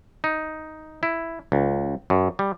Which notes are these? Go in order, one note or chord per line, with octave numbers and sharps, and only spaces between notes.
D#4
E4
C#2
F#2
G3